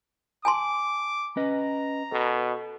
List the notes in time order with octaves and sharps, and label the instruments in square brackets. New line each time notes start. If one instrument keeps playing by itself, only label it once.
[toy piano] G#5 A5 C6 [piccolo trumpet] D6
[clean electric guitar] C#4 B4 D#5 [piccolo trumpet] A#5
[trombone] B2 [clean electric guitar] A4